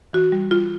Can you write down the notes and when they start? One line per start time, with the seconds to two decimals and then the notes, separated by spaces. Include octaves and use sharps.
0.13 E3 F#4
0.32 G3
0.51 G3 F4